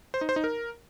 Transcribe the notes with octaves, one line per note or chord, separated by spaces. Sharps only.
C5
D#4
C5
D#4
A#4